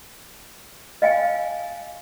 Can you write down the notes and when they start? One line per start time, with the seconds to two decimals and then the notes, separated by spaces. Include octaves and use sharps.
1.02 D#5 F5 G5 G#5